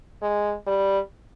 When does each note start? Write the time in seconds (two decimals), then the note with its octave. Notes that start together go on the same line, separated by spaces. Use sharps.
0.22 G#3
0.67 G3